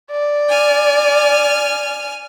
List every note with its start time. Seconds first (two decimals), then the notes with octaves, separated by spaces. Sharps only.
0.11 D5
0.50 G#5 F6